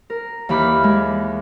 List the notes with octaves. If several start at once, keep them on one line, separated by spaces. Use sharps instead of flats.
A#4
D#2 E3 G4 B5 D6 F6
G#3